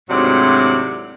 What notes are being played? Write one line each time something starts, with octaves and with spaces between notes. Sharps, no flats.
D2 G#2 C3 F#3 E4 D5